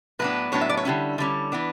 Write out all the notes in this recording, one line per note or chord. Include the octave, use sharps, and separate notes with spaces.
A2 F#3 B3 D4 B4
A2 F#3 B3 D4 C#5
E5
D5
C#5
D3 G3 C#4 E4
D3 G3 C#4
E3 B3 D4